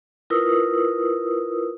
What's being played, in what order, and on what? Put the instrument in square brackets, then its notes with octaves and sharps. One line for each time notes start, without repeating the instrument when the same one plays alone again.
[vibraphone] E4 F4 A#4 B4 D#6 E6